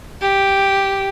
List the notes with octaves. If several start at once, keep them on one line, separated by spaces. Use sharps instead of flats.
G4